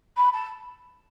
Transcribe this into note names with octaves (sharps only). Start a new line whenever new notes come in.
B5
A5